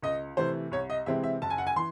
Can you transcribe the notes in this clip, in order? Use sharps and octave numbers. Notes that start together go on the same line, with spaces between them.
C#2 D#5
C3 E3 A3 C5
C2 C#5
D#5
C3 E3 G#3 C4 E5
E5
F#1 A5
G#5
F#5
G#5
E3 C6